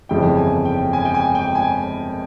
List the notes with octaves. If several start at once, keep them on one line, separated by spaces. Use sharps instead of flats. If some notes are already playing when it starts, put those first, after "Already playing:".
G1 F2 C#3 E3 G3 G5
G#5
G5
G#5
G5
G#5
G5
G#5